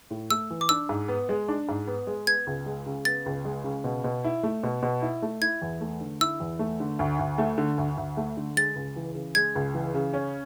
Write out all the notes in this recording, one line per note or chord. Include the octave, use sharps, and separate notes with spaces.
A2
A3 E6
E3
D6
D4 E6
G#2
B3
G#3
D4
G#2
B3
G#3
B3 G#6
C#2
G#3
C#3
B3 A6
C#2
G#3
C#3
B2
B2
E4
A3
B2
B2
E4
A3
E4 G#6
E2
A3
D3
E4 E6
E2
A3
D3
D2
D2
A3
D3
D2
D2
A3
D3
G#3 A6
C#2
E3
C#3
G#3 G#6
C#2
E3
C#3
C#4